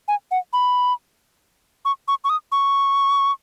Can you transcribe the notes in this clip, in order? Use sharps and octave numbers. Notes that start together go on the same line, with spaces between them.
G#5
F#5
B5
C#6
C#6
C#6
D#6
C#6